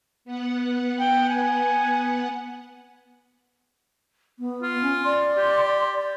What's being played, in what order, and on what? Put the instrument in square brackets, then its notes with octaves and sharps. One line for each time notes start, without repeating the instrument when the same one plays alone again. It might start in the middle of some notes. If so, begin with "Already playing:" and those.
[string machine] B3 F#5
[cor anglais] G5
G#5
[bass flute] B3
[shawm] F4
[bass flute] C#4
[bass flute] D5 [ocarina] C6
[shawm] G4
[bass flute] D5